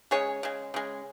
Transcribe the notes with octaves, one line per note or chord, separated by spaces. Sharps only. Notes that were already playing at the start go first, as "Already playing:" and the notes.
C#3 G#3 G#4 C#5
C#3 G#3
C#3 G#3